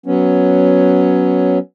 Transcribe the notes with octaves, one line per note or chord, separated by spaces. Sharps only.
F#3 B3 C#4